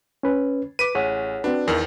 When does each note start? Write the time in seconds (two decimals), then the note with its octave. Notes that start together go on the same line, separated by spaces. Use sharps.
0.23 C#4 B4
0.79 B4 D6 B6 D#7
0.95 A1 G#4 C#5 F#5
1.44 C4 D4 F#4 B4
1.68 E2 D#3 A#4